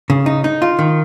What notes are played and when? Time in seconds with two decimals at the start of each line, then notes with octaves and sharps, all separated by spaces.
0.10 C#3
0.26 D#4
0.44 D#4
0.62 F4
0.79 D#3